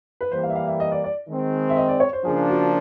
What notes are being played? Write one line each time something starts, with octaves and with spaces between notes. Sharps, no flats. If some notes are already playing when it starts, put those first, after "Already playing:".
B4
E3 G3 A#3 C5
F5
E5
F5
E5
D#5
D5
D5
D#3 G#3 C4
E5
D#5
D5
C#5
C5
C#3 F3 A#3 D4 G#4
F#4